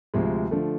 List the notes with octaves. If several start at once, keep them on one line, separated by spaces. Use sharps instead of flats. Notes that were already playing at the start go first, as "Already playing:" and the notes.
D2 C3 F3 G#3
D3 F3 A3